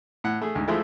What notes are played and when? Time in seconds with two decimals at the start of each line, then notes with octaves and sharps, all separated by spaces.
0.24 A2 F#5
0.41 A3 G#4
0.55 D2 G#2
0.68 F3 G#3 A3 E4 F4